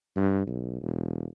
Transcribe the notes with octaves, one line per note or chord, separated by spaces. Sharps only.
G2
B1
E1